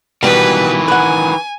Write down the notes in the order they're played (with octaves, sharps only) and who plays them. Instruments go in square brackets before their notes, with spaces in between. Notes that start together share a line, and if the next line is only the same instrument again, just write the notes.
[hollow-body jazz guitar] B2 G3 [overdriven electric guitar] D#3 E3 [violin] B4
[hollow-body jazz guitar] B4 F#5 [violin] G#5